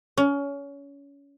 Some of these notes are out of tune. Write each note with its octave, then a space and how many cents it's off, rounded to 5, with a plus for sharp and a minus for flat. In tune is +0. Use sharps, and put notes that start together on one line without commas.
C#4 +25